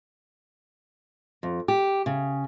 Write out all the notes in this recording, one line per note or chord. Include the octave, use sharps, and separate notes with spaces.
F2
G4
C#3